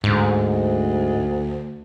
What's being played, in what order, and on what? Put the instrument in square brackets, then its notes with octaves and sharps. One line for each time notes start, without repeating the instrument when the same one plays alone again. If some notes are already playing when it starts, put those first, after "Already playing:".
[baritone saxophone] D2 [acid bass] G#2